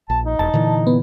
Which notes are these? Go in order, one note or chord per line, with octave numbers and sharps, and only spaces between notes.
A#1 A5
D#4
E1 A5
A#2 D3 E3
B3